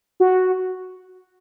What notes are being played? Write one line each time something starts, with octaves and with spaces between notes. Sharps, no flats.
F#4